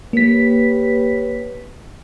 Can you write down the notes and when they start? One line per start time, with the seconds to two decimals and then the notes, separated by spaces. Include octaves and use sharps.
0.13 A#3 G4 B4 C#5 B6